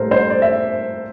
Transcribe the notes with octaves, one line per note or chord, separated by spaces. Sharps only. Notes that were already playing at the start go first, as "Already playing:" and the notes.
Already playing: A2 G3 A#3 A4 A#4 C5
C5
D5
E5